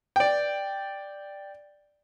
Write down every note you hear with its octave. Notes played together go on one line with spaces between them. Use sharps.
D5 G5